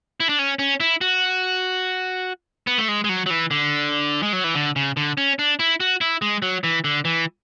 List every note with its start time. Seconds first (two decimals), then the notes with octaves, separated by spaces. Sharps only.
0.20 E4
0.29 D4
0.39 C#4
0.59 C#4
0.80 E4
1.01 F#4
2.67 B3
2.78 A3
2.88 G#3
3.04 G#3
3.09 F#3
3.26 F#3
3.30 E3
3.51 D3
4.23 G#3
4.33 F#3
4.44 E3
4.55 D3
4.76 C#3
4.97 D3
5.18 C#4
5.39 D4
5.59 E4
5.80 F#4
6.01 E4
6.22 G#3
6.42 F#3
6.64 E3
6.84 D3
7.05 E3